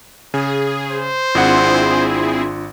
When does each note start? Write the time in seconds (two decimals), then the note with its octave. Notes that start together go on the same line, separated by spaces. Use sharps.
0.34 C#3 G#4
0.88 C5
1.35 G#1 C4 D4 E4 F4 G#4 F#5 C6